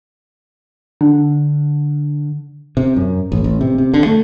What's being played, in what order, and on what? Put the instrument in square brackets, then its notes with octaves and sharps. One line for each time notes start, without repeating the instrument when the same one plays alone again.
[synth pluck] D3
[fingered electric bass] C3
F#2
A1
A1
C3
C3
D3
A3